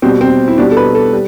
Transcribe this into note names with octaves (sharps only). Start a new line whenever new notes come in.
B2 G3 C4
C4
E4
B2 G3 D4
A4
B4
A4
G3